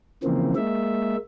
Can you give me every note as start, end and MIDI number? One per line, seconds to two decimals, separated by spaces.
0.24 0.54 49
0.24 0.54 52
0.24 0.54 53
0.24 0.54 58
0.24 0.54 60
0.56 1.16 56
0.56 1.16 58
0.56 1.16 76